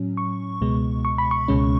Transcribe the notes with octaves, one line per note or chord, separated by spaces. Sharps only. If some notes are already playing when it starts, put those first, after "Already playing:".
Already playing: A2 F#3 C#4
C#6
C#2 B2 G#3 B3
C#6
B5
C#6
C#2 B2 G#3 C#4